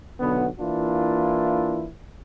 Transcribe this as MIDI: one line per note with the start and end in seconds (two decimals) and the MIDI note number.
0.20 0.47 35
0.20 0.47 50
0.20 0.47 59
0.60 1.87 52
0.60 1.87 58
0.60 1.87 62
0.60 1.87 64
0.60 1.87 65